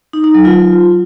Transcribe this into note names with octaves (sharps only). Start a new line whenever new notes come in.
D#4
D#4
F#3
F4